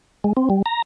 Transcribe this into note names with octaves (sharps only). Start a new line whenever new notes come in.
G#3
C4
G3
A#5